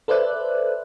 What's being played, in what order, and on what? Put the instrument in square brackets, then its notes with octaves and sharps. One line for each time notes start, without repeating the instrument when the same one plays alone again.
[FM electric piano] A4 B4 C5 D5 E5 F#6